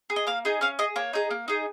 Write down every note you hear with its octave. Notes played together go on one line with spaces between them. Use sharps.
G#4
D#5
A#3 F5
D#4 G#4
C#4 F5
G#4 D#5
A#3 C#5
D#4 G#4
A#3
D#4 G#4